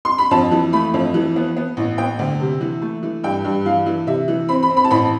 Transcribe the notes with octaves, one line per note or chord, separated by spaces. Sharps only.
C6
B5
F2 A5
E3
A3 B5
F2
E3
B3
B3
A1
B3 G5
D2
C3
E3
A3
E3
G2 G5
G2
E3 F5
E3
C3 E5
E3
C4 B5
B5
C4
B5
A5
A1 B5